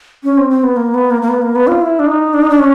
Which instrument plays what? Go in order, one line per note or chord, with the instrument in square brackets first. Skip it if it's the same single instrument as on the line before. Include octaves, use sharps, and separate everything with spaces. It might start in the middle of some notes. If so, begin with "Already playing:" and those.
[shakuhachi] C#4
C4
C4
B3
A#3
B3
A#3
A#3
B3
A#3
B3
F4
E4
D4
D#4
D4
D#4
D4
C#4